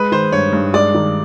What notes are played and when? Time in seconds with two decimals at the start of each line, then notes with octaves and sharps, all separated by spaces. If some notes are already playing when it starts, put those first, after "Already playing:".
Already playing: G#3 B4
0.12 D#3 C5
0.32 G2 C#5
0.53 G2
0.73 G#3 D5
0.94 D#3